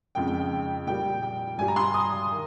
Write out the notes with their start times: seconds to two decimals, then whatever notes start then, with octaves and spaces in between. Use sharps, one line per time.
0.15 F2 C#3 G#3 G5
0.27 G5
0.40 G5
0.87 A#2 G3 G5
1.23 G5
1.58 G2 G3 G#5
1.68 A#5
1.76 C6
1.94 D#6
2.31 D#3